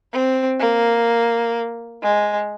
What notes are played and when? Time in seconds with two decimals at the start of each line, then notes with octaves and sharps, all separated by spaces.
0.12 C4
0.59 A#3
2.02 G#3